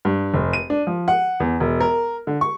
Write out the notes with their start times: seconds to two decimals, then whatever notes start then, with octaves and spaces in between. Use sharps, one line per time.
0.05 G2
0.34 F1
0.53 D#7
0.70 D4
0.87 F3
1.08 F#5
1.40 E2
1.60 E1
1.80 A#4
2.27 D3
2.41 C#6